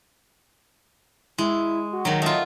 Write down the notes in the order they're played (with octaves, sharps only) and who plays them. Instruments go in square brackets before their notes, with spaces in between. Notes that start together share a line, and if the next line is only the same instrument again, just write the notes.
[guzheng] G#3 [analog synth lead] E4
[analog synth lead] F#4
[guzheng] D#3 F#3
[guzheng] A3 F4 [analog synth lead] D#5